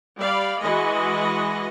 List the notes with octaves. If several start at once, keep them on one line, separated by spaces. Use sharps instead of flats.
G3 D5 F5 B5
E3 G#3 F#4 B4 D#5